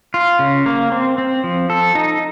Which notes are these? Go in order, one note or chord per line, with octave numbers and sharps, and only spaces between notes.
F4
C#3
A#3
C4
C4
F3
A4
D#4